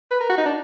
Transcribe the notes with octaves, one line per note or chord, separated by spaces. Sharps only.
B4
A#4
F#4
D#4
D4